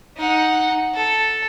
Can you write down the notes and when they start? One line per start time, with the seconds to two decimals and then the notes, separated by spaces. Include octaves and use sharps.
0.17 D#4 F#5
0.94 A4